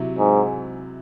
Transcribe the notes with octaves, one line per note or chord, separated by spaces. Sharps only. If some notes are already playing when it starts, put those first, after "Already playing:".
Already playing: C3 F#3 E4
G#2